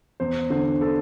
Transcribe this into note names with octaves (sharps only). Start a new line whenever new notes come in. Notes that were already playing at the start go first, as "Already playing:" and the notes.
E2 C5
D3 C5
A4